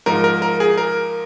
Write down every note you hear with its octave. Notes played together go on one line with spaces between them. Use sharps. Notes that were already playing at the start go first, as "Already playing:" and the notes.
G#2 F3 A#4
A#4
A#4
G#4
A#4